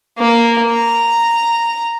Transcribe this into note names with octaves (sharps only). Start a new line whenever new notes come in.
A#3
A#5